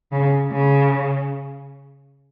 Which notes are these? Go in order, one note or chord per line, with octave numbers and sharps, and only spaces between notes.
C#3
C#3